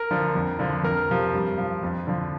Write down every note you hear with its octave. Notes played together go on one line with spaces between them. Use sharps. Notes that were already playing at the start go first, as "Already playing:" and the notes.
Already playing: A#4
D3 F3
F2
D3 F3
F2 A#4
C3 F3
G2
F3
F2
D3 F3